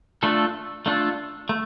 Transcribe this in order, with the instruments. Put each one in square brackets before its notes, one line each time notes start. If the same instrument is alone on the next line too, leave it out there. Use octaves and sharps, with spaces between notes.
[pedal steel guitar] A3 D4 F4 A4
A3 D4 F4 A4
A3